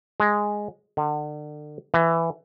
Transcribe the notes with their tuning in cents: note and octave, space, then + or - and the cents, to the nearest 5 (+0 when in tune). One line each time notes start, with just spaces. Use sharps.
G#3 +0
D3 +35
E3 +10